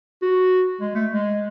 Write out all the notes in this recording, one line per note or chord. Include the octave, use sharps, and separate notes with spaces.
F#4
G#3
A3
G#3